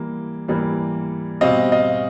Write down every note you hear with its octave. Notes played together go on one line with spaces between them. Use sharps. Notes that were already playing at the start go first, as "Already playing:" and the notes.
Already playing: E3 G3 A#3
E3 G3 A#3
B2 G3 C4 D#5 F5
D#5 F5